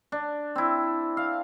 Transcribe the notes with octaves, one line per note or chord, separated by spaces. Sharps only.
D4
C4 E4
F5